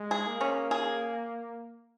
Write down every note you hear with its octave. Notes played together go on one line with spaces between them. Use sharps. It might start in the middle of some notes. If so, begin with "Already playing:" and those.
Already playing: G#3
G#4
A#3
C#4
G#4